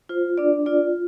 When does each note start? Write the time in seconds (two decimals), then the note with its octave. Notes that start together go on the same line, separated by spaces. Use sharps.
0.09 F4 C5
0.38 D4 D5
0.66 F4 D5